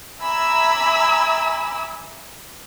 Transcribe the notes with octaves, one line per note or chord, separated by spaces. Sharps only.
E5 G#5 A#5 B5 D6 E6